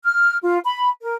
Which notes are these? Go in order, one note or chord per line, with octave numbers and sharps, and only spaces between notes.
F6
F4
B5
A#4